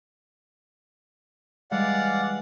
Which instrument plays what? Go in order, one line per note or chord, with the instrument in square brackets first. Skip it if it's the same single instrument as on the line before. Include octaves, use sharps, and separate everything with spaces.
[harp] E3 G3 G#3 [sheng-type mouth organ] D5 F5 F#5